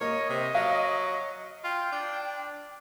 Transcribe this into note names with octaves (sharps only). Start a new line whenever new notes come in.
A#3 C#5 D#5
C3
F#3 F5
F4 G5
D4